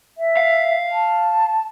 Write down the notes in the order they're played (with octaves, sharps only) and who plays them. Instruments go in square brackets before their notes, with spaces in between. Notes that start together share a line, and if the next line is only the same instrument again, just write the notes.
[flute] E5
[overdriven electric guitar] F5
[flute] A5